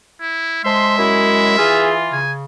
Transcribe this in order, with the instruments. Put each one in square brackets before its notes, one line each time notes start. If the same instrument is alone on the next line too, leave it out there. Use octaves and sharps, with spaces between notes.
[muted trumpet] E4
[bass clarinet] G#3 [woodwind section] C5 A5 C6 [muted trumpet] E5
[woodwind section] F#2 E4
[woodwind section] E3 F4 [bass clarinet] G#4
[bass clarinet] C#3 [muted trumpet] G#5